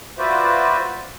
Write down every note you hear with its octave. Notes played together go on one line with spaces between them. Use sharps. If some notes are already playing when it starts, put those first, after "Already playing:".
F4 F#4 B4 C5 D5 E5